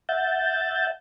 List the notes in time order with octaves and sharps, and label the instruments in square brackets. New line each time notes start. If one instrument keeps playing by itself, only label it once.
[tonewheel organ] E5 F#5 G6 A6